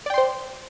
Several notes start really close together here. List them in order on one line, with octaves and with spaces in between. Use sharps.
D5 G5 C6 C5